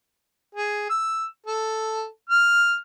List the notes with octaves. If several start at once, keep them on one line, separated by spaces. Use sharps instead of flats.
G#4
E6
A4
F6